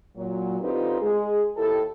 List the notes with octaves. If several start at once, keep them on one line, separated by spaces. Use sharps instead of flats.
A#2 F#3
D3 C4 D#4 F4 G4 B4
G#3 G#4
D#2 E4 G4 A4